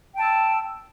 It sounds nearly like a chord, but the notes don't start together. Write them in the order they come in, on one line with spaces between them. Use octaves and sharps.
G5 A5 E6